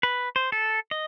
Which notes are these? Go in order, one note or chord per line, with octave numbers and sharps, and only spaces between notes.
B4
C5
A4
D#5